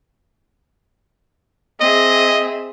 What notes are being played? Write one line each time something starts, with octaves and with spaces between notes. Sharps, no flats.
C4 G#4 D#5 E5